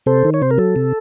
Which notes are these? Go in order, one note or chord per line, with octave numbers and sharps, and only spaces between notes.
C3 A4 C5
D#3
C#5
C3 C5
A#4
F#3 A4
C3